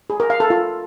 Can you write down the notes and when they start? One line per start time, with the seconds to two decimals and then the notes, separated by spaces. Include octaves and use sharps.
0.10 G#4
0.20 A#4
0.30 F5
0.40 A4
0.50 F4